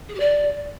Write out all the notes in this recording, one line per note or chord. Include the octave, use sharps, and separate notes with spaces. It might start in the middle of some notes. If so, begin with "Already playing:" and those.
G#4
G4
D5